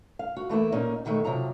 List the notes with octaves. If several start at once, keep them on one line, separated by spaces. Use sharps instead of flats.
F5
F#4
E3 A3 A#3 E4
A#2 A#3 C#4 D#4
B2 D#3 G#3 A3
C3 F3 F#3 A#5